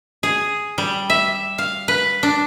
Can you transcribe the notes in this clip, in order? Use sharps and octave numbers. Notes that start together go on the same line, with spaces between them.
G#4
G3
E5
F5
B4
D4